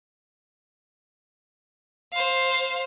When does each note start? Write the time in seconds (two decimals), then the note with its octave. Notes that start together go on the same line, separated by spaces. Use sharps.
2.13 C5 F5